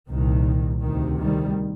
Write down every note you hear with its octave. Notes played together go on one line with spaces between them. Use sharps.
C2 A#2 D#3
D2 C3 D#3
D#3 G3